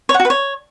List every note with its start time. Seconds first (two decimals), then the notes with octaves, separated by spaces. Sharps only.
0.09 C#5
0.14 F#5
0.20 F#4
0.25 B4
0.30 C#5